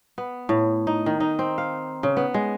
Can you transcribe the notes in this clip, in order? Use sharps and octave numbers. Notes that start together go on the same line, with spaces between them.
B3
A2
D#4
D#3
D#4
C4
F5
C#3
B3
G#3